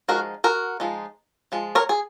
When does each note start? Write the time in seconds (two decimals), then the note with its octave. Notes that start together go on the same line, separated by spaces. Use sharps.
0.08 F3 G#3 D#4 F#4 A#4
0.44 F#4 A#4
0.80 F3 G#3 D#4
1.52 F3 G#3
1.75 A#4 C#5
1.89 G#4